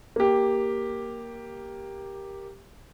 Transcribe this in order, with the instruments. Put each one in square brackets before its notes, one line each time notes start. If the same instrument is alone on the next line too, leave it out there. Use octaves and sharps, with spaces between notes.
[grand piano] A#3 G4